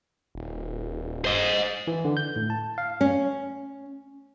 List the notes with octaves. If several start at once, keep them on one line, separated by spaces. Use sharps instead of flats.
D#1
C5 D#5
E3
D3
G6
A2
A5
F5
C#4